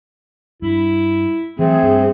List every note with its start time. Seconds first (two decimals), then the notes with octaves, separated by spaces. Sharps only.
0.62 G2 E4
1.59 E3 F#3 A3 C4 G#4
1.83 G2